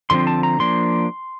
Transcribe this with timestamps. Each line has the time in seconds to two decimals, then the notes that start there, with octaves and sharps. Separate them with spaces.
0.10 D3 F3 C4 C6
0.27 A5
0.43 A#5
0.60 F3 A#3 D4 C6